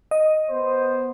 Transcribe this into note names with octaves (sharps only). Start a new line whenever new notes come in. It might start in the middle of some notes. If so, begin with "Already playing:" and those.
D#5
B3 C5